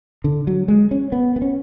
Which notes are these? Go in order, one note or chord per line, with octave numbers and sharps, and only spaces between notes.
D3
F#3
G#3
C#4
B3
B3
C#4